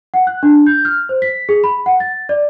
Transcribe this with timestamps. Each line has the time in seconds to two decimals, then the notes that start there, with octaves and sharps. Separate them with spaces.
0.14 F#5
0.27 F#6
0.43 D4
0.66 G6
0.85 F6
1.09 C5
1.22 B6
1.49 G#4
1.64 B5
1.86 F#5
2.00 A6
2.29 D5